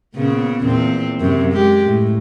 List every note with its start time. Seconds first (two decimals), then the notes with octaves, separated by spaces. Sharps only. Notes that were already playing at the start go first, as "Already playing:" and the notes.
0.15 A#2 C#3 B3
0.64 E2 A#2 C4
1.20 F#2 C3
1.53 G#3 G4
1.85 A2